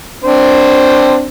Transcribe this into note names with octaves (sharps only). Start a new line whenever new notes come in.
C4 D4 C5